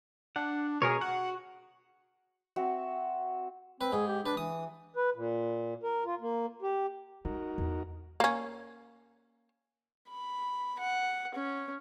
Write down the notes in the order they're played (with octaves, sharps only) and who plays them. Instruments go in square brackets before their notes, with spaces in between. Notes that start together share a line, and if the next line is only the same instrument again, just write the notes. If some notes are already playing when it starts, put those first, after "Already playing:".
[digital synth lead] D4 [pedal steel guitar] F#5
[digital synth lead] B2 [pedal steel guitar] G#4 A#4 C#5
[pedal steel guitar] F#4 [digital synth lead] F#5
[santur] C4 F#4 E5
[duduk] C4 [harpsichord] B4
[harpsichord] G#2 [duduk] G#4
[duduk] G4
[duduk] D4 [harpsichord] B4
[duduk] E3 [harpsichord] D#6
[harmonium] B4
A#2
A#4
F4
A#3
G4
[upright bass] G#3 [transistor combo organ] D#4 F#4 A#4
[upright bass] E2
[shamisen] A#3 C#4
[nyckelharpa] B5
F#5
C#4